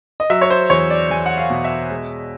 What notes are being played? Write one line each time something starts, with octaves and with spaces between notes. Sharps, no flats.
D#5
F#3 E5
C#5
C5
E2 C#5
D5
E2 G#5
F#5
F5
B2
E5
G#3